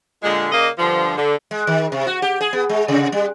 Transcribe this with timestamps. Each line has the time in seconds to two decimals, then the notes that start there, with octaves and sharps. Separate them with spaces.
0.23 A#2 D3 G#3
0.52 C#3 A#3 D5 D#5
0.78 G2 D3 F3
1.17 D3
1.51 G#3
1.67 D#3
1.92 C3
2.07 F#4
2.22 G4
2.41 G#4
2.53 B3
2.69 G#3
2.88 C3
3.12 G3